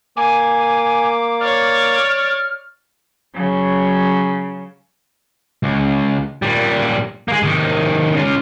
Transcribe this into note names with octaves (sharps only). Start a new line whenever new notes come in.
A#3 G#5 D6
C#5 D5 F6
C#3 F#3
C#2
A#2 G3
G#3 A#3
C3 D#3
C#3 F4